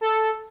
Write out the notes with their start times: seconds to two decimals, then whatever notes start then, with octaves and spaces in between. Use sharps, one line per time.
0.01 A4